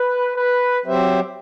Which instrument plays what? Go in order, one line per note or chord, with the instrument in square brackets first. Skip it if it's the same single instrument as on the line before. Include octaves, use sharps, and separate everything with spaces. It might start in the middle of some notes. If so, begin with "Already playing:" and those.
Already playing: [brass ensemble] B4
B4
[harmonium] F#3 C4 G4 C5 E5